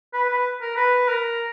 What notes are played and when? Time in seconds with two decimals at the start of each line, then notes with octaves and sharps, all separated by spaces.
0.13 B4
0.29 B4
0.61 A#4
0.76 B4
1.08 A#4